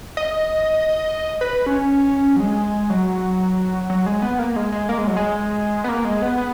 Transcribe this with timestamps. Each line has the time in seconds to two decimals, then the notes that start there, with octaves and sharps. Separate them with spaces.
0.17 D#5
1.41 B4
1.66 C#4
2.36 F#3
2.40 G#3
2.90 F#3
3.90 F#3
4.06 G#3
4.22 B3
4.39 A#3
4.56 G#3
4.72 G#3
4.89 A#3
4.98 G#3
5.07 F#3
5.17 G#3
5.84 B3
5.89 A#3
6.05 G#3
6.22 B3
6.38 B3